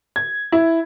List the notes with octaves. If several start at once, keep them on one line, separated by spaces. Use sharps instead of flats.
G#6
E4